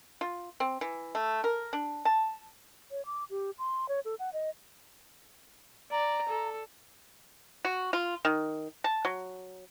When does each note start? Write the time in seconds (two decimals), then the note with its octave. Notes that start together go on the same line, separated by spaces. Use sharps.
0.21 F4
0.60 C4
0.81 E3
1.15 A3
1.44 A#4
1.73 D4
2.05 A5
2.91 C#5
3.06 D6
3.30 G4
3.59 C6
3.89 C#5
4.05 A4
4.19 F#5
4.33 D#5
5.92 D5 A#5
6.29 A4
7.65 F#4
7.93 F4
8.25 D#3
8.84 A5
9.05 F#3